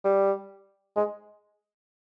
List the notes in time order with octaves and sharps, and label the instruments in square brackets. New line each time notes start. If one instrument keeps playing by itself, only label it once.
[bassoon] G3
G#3